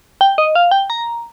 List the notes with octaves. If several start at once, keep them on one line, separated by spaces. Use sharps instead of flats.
G5
D#5
F5
G5
A#5